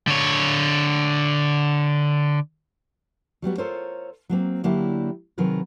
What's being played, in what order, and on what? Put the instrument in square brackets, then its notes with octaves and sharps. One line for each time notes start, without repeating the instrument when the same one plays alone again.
[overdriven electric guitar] D3 C#5
[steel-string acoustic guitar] F#3 G3 B3 F#4
F4 A4 A#4 C5 C#5
F#3 A#3 C4
D3 F#3 A#3 D4 E4 G4
C3 D#3 F#3 G#4 A#4 B4